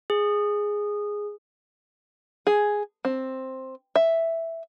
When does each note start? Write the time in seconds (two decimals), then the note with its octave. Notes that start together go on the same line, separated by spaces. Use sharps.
0.10 G#4
2.47 G#4
3.05 C4
3.96 E5